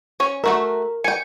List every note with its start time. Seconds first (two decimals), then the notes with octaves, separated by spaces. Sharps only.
0.20 C#4 C#5
0.44 A3 F#4 A#4 E5
1.04 G5 G#5 C#7